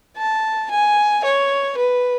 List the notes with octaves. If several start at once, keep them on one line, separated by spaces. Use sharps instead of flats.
A5
G#5
C#5
B4